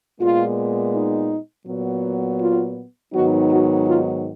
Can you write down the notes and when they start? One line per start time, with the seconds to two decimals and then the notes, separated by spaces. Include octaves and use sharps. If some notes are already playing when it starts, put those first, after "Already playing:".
0.20 A#2 G#3 B3 F4
0.93 D#4
1.67 A#2 F#3 B3
2.40 F4
3.13 G#2 D#3 F#3 B3 D#4 F#4
3.50 F#4
3.86 F4